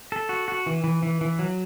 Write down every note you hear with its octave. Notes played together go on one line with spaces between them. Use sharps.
A4
F#4
F#4
E3
E3
E3
E3
F#3